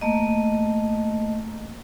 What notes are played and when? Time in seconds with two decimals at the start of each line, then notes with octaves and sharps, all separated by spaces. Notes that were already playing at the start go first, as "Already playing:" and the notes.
0.01 A3 A#3 D#5